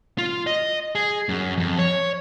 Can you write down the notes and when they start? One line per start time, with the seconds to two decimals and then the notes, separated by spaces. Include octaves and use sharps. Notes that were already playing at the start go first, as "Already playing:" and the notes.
0.18 F4
0.47 D#5
0.95 G#4
1.29 F#2
1.58 F2
1.78 C#5